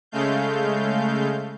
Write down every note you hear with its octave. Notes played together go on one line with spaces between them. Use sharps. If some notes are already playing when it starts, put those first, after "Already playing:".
C#3 G#3 A3 F5 G6